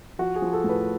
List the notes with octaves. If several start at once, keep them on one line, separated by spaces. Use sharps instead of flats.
F3 F#4
G#4
F3
A4
A2
B4